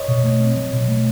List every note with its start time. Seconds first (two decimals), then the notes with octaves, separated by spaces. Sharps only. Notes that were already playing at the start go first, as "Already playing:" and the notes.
Already playing: C#5 D#5
0.08 B2
0.24 A3
0.40 C4
0.56 F#3
0.73 B2
0.88 A3